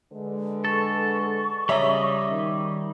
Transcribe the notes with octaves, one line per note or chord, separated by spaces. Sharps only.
D3 G#3 B4
A4 C#6
C#3 G3 C#5 D#5 E5 A#5
D#3